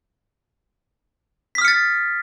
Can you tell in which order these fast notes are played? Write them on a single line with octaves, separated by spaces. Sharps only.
B6 D#6 F6 C#7 A6